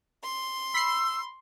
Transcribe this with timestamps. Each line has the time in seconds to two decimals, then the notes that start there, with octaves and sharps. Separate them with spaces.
0.24 C6
0.74 B5 E6 C7